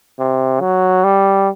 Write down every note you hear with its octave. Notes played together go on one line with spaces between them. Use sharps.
C3
F#3
G3